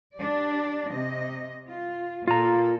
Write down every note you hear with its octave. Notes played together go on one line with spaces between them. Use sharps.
D4 G4 D5
C3 D#5
F4
A#2 A#3 F4 A4 A#5